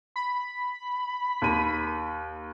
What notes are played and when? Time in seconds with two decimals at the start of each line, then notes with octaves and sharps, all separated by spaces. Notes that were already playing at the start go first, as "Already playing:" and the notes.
0.16 B5
1.42 D#2 D#7